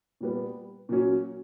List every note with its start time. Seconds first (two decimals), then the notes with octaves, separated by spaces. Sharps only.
0.21 A#2 G3 B3
0.89 A#2 F#3 C#4